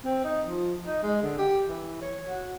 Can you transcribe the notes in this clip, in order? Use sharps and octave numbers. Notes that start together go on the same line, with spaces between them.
C4
D#4
F3
D#4
G#3
D3
G4
E3
C#5
F#4